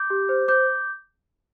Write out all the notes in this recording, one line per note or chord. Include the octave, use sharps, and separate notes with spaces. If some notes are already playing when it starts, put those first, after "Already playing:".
Already playing: D6 G6
G4
C5
C5 D6 G6